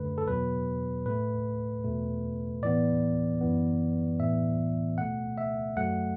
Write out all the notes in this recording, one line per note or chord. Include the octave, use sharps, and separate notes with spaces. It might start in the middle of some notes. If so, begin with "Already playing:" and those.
Already playing: F#2 D3 A3 B4
A4
E2 B2 F#3 B3 B4
A2 A3 B4
E2 B2 A3
A2 E3 B3 D5
F#2 E3 B3
A2 E3 B3 E5
B2 A3 F#5
E5
F#2 F#3 A3 F#5